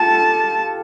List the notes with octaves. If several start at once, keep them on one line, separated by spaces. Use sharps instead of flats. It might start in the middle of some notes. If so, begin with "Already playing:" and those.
Already playing: F4 G4 A4 A5